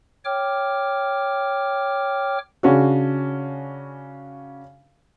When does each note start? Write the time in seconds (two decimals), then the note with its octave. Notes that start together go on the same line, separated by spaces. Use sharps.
0.25 C#5 G5 D6 F6
2.63 C#3 C#4 D4 F#4